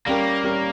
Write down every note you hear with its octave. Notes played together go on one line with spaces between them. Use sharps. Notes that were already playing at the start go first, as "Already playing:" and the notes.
G3 A#3 C#4 G4 A#4
G3 C#4 G4 A#4